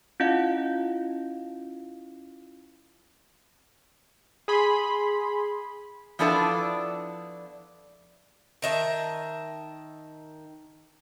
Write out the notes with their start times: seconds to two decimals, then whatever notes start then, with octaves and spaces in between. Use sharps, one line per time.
0.20 C#4 E4 F4 D#5 F5
4.48 G#4 B5 C6
6.19 F3 B3 D4 E4 A4 D5
8.62 D#3 D#5 E5 A5